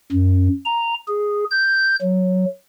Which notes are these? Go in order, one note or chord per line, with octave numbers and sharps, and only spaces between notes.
F#2
A#5
G#4
G6
F#3